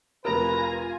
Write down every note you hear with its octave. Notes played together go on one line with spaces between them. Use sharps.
F1 F4 A#4 B4 G#5 A#5